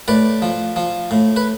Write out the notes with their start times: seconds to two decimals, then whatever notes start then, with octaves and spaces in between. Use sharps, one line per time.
0.08 A2 B4 D5
0.42 F3
0.76 F3
1.11 A2
1.36 B4